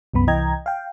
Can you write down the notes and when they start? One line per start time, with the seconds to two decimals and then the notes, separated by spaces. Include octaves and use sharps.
0.14 C2 F#2 B3 B5
0.27 C2 E3 D#5 G5 A#5 G#6
0.66 F5 G5